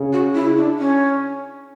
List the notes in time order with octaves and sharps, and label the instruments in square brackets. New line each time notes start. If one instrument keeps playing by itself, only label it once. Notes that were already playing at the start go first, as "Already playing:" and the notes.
Already playing: [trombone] C#3
[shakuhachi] F#4
E4
D4
C#4